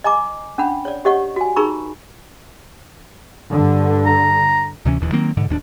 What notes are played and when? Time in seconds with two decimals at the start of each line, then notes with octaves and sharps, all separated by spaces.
0.04 D#5 G#5 A#5 D6
0.58 C#4 D4 F#5 B5
0.85 C#5 D5
1.05 G4 C#5 D#5 F#5 C#6
1.36 F#4 G#5
1.56 D#4 G#4 A#4 A#5 B5 C#6
3.50 G2 D3
4.06 A#5
4.85 D2 C3 E3 C#4
5.00 E1 D#2 C#3 E3
5.12 D#3 F#3 A#3 C4
5.37 G#2 B2 D3
5.49 D1 D#2 C#4 D4